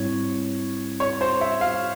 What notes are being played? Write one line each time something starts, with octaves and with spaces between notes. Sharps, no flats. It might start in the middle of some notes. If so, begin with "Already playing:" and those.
Already playing: G#2 G3 C4 E4 C#5
C#5
C5
E5
F5